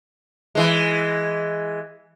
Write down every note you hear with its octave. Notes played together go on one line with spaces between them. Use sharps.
E3 G#3